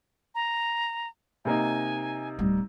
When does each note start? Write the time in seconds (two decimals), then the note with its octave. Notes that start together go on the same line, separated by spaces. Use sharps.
0.35 A#5
1.45 C3 A#3 D#4 G#5
2.39 D1 G3